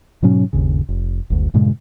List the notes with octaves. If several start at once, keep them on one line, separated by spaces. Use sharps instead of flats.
G#2 B2 F#3 C#4
G1 D#2 C#3
F1
F#1 D2
G2 A#2 C#3 G#3